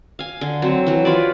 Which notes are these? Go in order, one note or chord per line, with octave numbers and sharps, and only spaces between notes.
F5 G#5
D3
F#3 C4
E3 F#3
F4 B4 C#5 D5